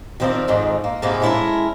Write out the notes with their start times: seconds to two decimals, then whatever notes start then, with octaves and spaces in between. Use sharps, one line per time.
0.20 D#3 F3 B3 C4 A#4 D5
0.48 F2 G#2 D#3 D#4
0.84 A#3
1.02 G#2 C3 F3 G#3 A#3 B3
1.22 G#3 C#4 E4 G4 A4 A#4